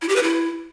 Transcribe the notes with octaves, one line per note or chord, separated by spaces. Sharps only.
E4
G4
B4
E4